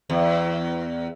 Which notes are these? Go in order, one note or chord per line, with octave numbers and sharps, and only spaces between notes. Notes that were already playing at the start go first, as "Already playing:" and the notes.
E2